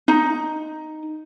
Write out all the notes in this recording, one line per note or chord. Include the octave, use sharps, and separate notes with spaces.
D#4